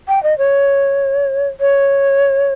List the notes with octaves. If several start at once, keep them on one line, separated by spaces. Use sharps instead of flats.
G5
D#5
C#5
C#5